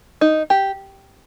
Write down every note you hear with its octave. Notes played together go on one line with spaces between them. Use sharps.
D#4
G4